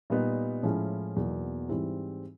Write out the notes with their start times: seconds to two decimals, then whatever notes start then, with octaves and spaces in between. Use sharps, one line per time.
0.10 A#2 G3 B3 D#4
0.63 A2 F3 G#3 C#4 E4
1.16 E2 B2 F#3 A#3 D#4
1.69 G#2 E3 G3 C4 E4